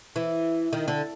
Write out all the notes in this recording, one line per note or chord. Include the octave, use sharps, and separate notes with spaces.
E3
D#3
D3